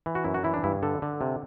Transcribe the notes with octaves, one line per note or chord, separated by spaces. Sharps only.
E3
F#4
F#2 E4
F#4
E3 E4
D4
G2 E4
D3 A4
D3
C3